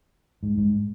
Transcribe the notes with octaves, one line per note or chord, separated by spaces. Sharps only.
G#2
G#2